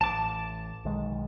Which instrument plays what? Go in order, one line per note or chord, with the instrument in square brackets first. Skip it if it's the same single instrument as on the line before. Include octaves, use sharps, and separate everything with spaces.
[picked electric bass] A1 [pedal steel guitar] A5 D6
[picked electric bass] B1 D#3 G#3